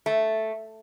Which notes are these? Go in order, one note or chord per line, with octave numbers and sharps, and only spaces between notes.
A3